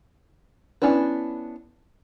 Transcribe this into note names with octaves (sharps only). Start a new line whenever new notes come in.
B3 C#4 D4 E4 B4